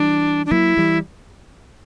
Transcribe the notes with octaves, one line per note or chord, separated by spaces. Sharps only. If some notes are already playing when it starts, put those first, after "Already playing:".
Already playing: E3 G3 D4
D4
F#3 A#3 E4
E3 G3